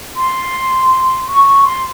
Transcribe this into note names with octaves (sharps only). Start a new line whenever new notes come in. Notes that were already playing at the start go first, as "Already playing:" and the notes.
C6
C#6
C6